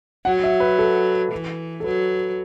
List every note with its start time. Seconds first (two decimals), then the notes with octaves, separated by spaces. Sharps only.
0.25 F#3 F#5
0.44 E5
0.60 B4
0.79 A4
1.32 E3
1.80 A4
1.84 F#3 B4